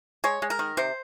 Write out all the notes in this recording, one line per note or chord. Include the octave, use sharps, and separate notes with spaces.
G#3 C#5
G#3
A#4
D#3
C3 C5